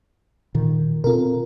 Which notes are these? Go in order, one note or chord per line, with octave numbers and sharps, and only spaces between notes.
A#2 D#3
B2 C4 F4 A4 A#4